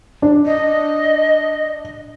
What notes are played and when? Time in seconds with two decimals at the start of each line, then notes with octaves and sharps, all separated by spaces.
0.22 D4
0.46 D#5